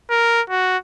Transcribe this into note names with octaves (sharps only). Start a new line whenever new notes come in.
A#4
F#4